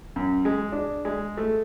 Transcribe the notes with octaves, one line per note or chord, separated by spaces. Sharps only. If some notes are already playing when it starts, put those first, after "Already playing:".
F#2
G#3
D4
G#3
A3